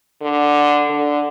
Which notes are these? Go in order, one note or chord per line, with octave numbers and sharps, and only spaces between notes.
D3
D3